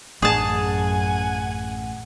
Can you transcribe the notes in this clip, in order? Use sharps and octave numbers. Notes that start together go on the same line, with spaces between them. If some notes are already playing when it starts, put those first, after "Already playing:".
A1 F#2 G#4 F#5 G#5 A5